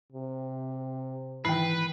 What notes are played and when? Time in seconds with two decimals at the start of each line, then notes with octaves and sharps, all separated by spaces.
0.12 C3
1.45 G#2 D#3 E3 B4 G5 C7